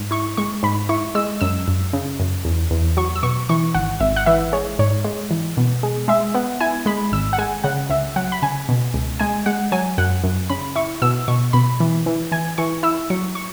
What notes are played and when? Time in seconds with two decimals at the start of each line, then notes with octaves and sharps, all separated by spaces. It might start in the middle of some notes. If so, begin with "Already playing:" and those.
Already playing: G#2
0.11 E4 C#6
0.37 G#3 C#6
0.63 G#2 B5
0.89 E4 C#6
1.15 G#3 E6
1.41 F#2 E6
1.68 F#2
1.93 C#3
2.20 F#2
2.45 E2
2.71 E2
2.97 F#3 C#6
3.15 E6
3.23 B2 C#6
3.49 E3 C#6
3.74 G#1 F#5
4.00 G#1 E5
4.16 F#5
4.26 E3 E5
4.53 G#3 C#5
4.79 G#2 C#5
5.04 G#3
5.31 E3
5.57 B2
5.83 G#3
6.08 G#3 E5
6.34 B3 F#5
6.60 E4 G#5
6.86 G#3 B5
7.12 G#1 E6
7.33 F#5
7.38 G#3 G#5
7.64 C#3 F#5
7.90 C#2 E5
8.16 F#3 F#5
8.32 B5
8.42 C#3 G#5
8.69 B2
8.94 C#2
9.19 G#3 G#5
9.46 G#3 F#5
9.72 F#3 G#5
9.98 F#2 F#5
10.24 F#2
10.50 C#3 B5
10.76 E4 C#6
11.02 B2 E6
11.28 B2 C#6
11.53 B2 B5
11.80 E3
12.06 E3
12.32 E3 G#5
12.58 E3 C#6
12.83 E4 E6
13.10 F#3 C#6
13.35 C#6